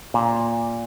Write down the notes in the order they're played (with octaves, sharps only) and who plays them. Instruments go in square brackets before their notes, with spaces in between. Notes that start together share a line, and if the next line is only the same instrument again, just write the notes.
[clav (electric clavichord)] A#2